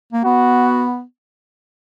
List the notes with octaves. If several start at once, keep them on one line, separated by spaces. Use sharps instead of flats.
A#3
B3 F#4